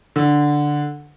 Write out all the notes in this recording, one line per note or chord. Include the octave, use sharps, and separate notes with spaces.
D3